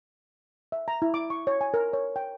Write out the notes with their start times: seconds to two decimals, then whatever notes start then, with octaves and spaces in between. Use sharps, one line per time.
0.72 E5
0.88 A#5
1.02 E4
1.14 D6
1.30 C#6
1.47 C#5
1.61 G#5
1.74 A#4
1.93 C#5
2.16 G5